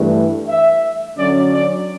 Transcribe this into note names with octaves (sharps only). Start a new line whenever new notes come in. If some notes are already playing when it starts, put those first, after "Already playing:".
Already playing: G2 E3 A3
E5
D3 F#3 C#4 D5
D5